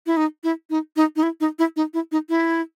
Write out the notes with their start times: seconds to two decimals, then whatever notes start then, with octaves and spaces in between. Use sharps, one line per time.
0.06 E4
0.17 D#4
0.44 E4
0.70 D#4
0.96 D#4
1.16 D#4
1.23 E4
1.41 D#4
1.59 E4
1.76 D#4
1.94 E4
2.12 D#4
2.29 E4